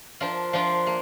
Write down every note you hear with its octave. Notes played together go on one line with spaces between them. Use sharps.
F3 D4 F4 A#4
F3 D4 F4 A#4
A#3